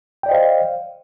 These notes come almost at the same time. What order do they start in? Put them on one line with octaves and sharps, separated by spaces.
G5 D5 D#5 C5 F5